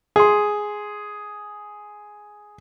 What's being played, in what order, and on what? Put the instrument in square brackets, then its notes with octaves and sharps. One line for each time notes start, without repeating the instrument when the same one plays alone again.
[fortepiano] G#4 C6